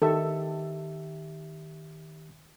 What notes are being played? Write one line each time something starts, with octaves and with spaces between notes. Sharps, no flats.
D#3 G4 A4 E5